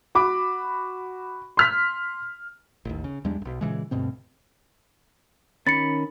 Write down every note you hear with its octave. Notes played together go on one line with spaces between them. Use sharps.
F#4 B5 D6
C6 F6 B6
A1 D#2
C#3
E2 G3 G#3 D4
E1 B1
A#2 C#3 E3 G#3
D2 G2 B2 C4
D#3 C#4 B5 A6 C#7